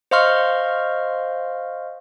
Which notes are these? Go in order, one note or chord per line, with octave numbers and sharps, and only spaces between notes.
C5 D#5 F5 C6 C#6 F6